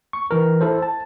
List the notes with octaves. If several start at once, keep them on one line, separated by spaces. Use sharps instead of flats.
C#6
E3 A#4
E4 A4 C5
A5